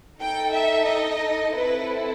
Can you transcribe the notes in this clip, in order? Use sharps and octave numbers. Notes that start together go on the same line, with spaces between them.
D#4 A4 G5
E5
D#5
C4 E4 A4 B4